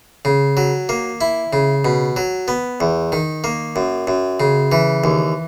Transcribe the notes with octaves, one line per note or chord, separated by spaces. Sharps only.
C#3
F#3
A#3
E4
C#3
B2
F#3
B3
E2
D#3
A#3
F#2
F#2
C#3
E3
D#2